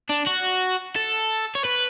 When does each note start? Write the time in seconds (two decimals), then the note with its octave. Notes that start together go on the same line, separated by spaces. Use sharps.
0.09 D4
0.26 F#4
0.96 A4
1.55 C#5
1.65 B4